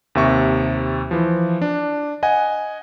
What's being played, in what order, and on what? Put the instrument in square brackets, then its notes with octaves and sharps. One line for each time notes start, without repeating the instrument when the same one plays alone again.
[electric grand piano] D#2 C3 E5 C#6
E3 F3
D4
D#5 F#5 G#5